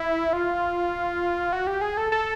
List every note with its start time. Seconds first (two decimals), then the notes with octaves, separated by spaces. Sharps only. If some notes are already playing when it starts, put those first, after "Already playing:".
Already playing: E4
0.33 F4
1.53 F#4
1.67 G4
1.81 G#4
1.97 A4
2.12 A4